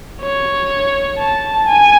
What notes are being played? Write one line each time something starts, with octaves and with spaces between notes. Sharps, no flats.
C#5
A5
G#5